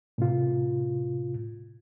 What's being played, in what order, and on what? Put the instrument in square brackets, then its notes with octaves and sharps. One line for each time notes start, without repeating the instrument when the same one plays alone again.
[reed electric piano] A2 C3 F4